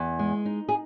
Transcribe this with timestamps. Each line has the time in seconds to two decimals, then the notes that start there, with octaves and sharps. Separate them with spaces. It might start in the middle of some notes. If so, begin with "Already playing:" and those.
Already playing: E2
0.19 G#3
0.45 D#4
0.69 G#4